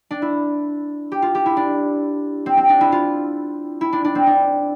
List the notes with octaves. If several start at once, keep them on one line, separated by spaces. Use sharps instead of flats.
D4
E4
G4
F4
G4
E4
D4
C4
C4
D4
E4
F4
E4
D4
D4
C4
D4